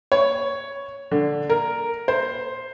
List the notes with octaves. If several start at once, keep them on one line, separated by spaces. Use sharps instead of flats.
C#5
D3
A#4
C5